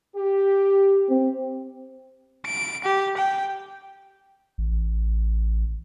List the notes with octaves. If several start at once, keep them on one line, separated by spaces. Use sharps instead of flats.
G4
C4
D7
G4
G5
A1